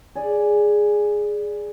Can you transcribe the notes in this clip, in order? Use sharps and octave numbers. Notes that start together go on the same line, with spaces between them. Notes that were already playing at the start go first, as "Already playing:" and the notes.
G#4 D5